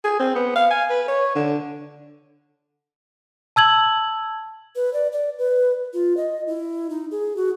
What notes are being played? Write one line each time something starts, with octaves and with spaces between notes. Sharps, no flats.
G#4
C4
B3
F5
G#5
B4
C#5
D3
A5 E6 G#6 F#7
B4
D5
D5
B4
F4
D#5
E4
D#4
G#4
F#4